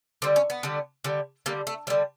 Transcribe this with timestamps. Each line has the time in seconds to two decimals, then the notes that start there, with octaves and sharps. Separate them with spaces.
0.22 D3 G3 C4
0.36 C#4
0.50 B3
0.63 D3 G3
1.04 D3 G3
1.46 D3 G3 A#3
1.67 A3
1.87 D3 G3 A3